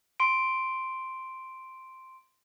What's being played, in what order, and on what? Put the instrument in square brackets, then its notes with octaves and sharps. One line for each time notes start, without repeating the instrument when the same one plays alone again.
[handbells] C6 D7